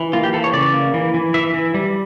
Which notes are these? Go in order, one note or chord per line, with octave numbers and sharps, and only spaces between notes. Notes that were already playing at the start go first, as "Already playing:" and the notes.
Already playing: E3
A#3 F4
G4
E3 A4
C#5
C#3 D5
A#3
E3
E3
E3 E5
E3
G3